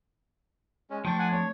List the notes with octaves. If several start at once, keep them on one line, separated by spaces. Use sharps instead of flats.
G#3 C#4
F3 A3 D4 G5 C#6
F#5 G#5
A3 C4 C#5